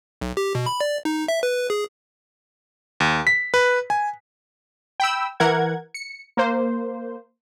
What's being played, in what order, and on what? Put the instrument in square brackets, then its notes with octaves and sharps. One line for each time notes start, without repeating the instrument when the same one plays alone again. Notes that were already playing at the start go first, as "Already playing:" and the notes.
[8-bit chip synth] B1
G4
B2
B5
D5
D#4
E5
B4
G#4
[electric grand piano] D#2
B6
B4
G#5
[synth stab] G5 B5 E6
E3 A#4 F#5 G#6
C#7
A#3 C5